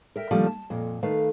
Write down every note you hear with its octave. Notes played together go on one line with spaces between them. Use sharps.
A#4 E5 G5
D3 D#3 F3 G3 A3 A#3
A5
F2 A#2
D#3 A3 B4 F5